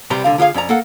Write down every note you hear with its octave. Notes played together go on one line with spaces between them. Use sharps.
C2 C3 G3 B4 A#5 C6
C2 D3 F5
D3 F4 G#4 F5
F2 C#4 D5 A#5
A#3 A4 F#5